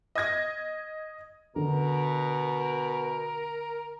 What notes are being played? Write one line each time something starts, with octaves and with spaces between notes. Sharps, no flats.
D#5 D#6 G#6 A#6
B2 D3 A#4